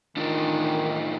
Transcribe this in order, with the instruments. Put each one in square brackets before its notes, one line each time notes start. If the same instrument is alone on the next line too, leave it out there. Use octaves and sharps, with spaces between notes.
[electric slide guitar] A2 D4 F4 [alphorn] D#3